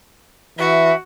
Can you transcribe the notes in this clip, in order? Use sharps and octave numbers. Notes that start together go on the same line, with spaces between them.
E3 F#4 E5